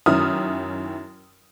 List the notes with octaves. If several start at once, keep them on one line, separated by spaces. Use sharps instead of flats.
F#2 D#3 C#4 E4 D#6 F6